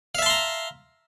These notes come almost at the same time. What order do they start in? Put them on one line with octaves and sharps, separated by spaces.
F5 E5 A5 C6 A#5